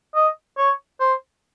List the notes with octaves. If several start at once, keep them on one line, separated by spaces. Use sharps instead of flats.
D#5
C#5
C5